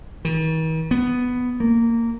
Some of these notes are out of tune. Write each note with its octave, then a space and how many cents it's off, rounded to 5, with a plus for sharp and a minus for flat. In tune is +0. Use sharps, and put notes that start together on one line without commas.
D#3 +45
B3 +5
A#3 -15